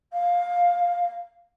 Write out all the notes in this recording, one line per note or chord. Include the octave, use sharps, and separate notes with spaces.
F5